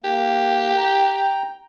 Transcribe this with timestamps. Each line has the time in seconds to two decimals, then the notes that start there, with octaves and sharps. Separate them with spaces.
0.04 A#3 G4
0.78 G5 A#5